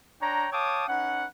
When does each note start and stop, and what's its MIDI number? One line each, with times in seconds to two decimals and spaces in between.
0.21 0.46 62
0.21 0.46 73
0.21 0.46 79
0.21 0.46 82
0.52 0.86 73
0.52 0.86 77
0.52 0.86 79
0.52 0.86 81
0.52 0.86 86
0.52 0.86 87
0.88 1.26 61
0.88 1.26 63
0.88 1.26 71
0.88 1.26 78